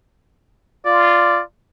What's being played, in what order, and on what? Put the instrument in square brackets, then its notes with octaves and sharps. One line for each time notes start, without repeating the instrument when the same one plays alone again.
[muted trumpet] F4 [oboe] D5